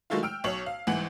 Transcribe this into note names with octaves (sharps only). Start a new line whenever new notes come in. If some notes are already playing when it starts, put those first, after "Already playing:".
D#3 F#3 G#3 A3 E4 F4
G5 E6 F6 D7
B1 C#5 F#7
F5
C2 G#2 E3 F#5 F#7